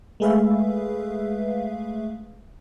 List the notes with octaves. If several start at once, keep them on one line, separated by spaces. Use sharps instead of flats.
G#3 A3 G#4 B4 E5 F5